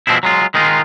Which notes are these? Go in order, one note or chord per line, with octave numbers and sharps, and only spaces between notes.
B2 F3 G#3 C4 E4
F#3 G#3 F4
D#3 G#3 D#4 F4